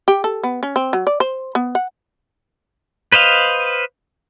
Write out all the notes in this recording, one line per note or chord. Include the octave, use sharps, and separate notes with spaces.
G4
A4
B3
C#4
C4
F#3
D5
C5
B3
F#5
B4 C5 D#5 F5